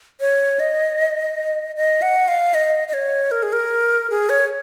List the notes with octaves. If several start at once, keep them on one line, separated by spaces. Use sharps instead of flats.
C#5
D#5
D#5
F#5
F5
D#5
D#5
C#5
A#4
G#4
A#4
G#4
C#5